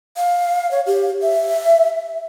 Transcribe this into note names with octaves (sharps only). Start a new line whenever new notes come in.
F5
C#5
G4
E5